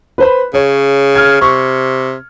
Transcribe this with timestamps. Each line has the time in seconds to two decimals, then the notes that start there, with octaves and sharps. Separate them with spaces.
0.18 B4 C5 B5
0.54 C#3 C#5
1.15 F6 G#6
1.41 C3 C#6